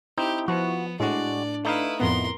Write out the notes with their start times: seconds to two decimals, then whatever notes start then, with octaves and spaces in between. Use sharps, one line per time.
0.18 C4 D#4 E4 G4
0.48 F3 B3 F#4
1.00 A2 G#3 D4 F#4 D5
1.65 A3 D#4 E4 B4 F5
2.00 F2 A2 B3 A#4 C6